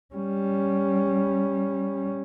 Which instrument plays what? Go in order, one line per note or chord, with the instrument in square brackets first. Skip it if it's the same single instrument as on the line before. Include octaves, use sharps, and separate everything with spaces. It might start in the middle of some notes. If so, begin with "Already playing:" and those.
[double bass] G3 C#4